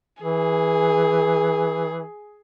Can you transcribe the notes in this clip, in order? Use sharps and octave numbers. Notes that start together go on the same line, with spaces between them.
E3 G#4